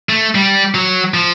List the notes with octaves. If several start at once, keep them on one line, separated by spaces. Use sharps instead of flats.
A3
G3
F#3
F3